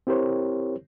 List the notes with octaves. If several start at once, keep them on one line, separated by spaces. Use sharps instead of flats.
C4 E4 G4 A#4 C5 C#5